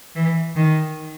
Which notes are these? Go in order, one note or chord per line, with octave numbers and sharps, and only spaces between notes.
E3
D#3